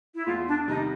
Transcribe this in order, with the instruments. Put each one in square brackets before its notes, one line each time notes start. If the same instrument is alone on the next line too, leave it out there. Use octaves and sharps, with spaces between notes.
[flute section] E4
[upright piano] E2 [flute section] F4
[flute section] D4
[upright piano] C3 D#3 G3 [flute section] D#4